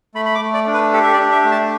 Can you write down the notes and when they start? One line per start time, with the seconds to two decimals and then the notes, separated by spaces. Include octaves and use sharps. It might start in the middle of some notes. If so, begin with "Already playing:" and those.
0.14 A3 B5
0.26 B5
0.35 D6
0.40 A3
0.54 D5
0.67 D4
0.74 B4
0.93 G4 A4
1.03 E5
1.13 D5
1.19 D4
1.32 E5
1.45 A3
1.52 A5